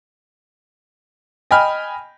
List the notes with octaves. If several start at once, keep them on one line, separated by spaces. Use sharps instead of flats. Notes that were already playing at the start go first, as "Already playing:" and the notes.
D#5 G5 G#5 B5 F6